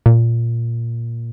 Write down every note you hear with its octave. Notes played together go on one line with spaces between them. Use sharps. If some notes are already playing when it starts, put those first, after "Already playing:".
A#2